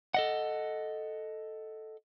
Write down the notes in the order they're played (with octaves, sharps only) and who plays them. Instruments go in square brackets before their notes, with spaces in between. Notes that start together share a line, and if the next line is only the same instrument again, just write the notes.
[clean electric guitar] A4 D#5 F#5